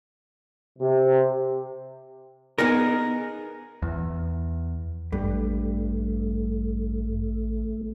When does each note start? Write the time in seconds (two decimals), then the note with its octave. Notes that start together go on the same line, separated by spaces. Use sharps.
0.79 C3
2.58 B3 D#4 G#4 A#4
3.82 E2
5.12 A1 G2 A3